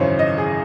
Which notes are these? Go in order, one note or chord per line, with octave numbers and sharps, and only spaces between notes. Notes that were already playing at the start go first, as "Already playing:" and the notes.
Already playing: G#1 F#2 C#3 E3 C5 C#5
D#5
G#4